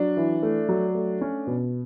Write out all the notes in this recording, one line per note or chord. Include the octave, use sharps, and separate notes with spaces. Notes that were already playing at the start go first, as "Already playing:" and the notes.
Already playing: F#3 D4
E3
A3
F#3
A3
C#4
B2